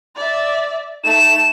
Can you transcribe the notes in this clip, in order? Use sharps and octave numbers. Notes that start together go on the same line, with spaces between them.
D5 E5
A3 D#4 E7